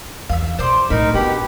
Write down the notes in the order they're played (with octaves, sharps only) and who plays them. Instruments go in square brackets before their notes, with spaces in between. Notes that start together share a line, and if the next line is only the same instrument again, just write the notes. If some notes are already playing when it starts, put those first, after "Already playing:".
[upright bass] E2 [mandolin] E5 F5
[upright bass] B2 [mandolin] C5 D5 C6
[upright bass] A2 A3 [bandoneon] D#4 A#4 [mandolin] B5
[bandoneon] B2 G4 [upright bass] D4 [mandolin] F#5 B5